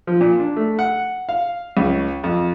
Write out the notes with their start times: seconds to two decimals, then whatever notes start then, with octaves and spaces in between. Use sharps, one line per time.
0.07 F3
0.21 A#2
0.40 D4
0.56 A3
0.79 F#5
1.29 F5
1.77 C#2
2.24 F2